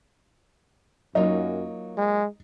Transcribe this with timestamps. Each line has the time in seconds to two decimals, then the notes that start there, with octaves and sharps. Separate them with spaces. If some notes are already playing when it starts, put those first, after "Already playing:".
1.15 F#2 F#3 A#3 D#4 F4
1.98 G#3